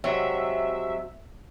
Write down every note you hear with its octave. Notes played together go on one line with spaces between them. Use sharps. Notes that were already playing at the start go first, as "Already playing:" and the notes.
C3 F#3 G#3 E5